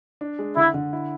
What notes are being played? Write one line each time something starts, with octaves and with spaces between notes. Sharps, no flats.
D4
G#3
D3 E4
D3
E4